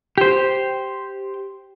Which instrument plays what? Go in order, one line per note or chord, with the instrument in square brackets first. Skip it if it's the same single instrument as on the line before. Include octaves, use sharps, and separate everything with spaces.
[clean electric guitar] G4 C5